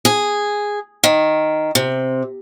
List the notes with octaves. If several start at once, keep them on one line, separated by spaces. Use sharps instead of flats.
G#4
D#3
C3